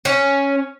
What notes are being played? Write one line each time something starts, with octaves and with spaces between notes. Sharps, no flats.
C#4